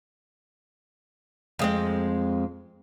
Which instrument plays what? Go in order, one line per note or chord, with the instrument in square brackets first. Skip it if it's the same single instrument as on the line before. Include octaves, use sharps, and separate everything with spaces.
[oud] F2 G#3 C4